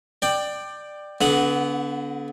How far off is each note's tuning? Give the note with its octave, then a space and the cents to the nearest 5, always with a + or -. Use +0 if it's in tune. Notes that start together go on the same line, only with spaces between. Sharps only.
D5 +20 G5 +0
D3 -35 B3 +0 F#5 -10